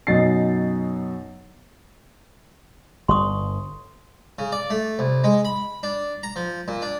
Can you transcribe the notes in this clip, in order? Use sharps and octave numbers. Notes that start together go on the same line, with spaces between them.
F#2 B2 D#4 A6 C7
G1 C6 C#6 D#6
C#3
D5
A3
C2
G#3
B5
D4
A#5
F3
A#2
D4